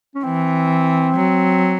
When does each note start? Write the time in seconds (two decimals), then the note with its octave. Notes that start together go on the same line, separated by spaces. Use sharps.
0.15 C#4
0.23 E3 C4
1.17 F#3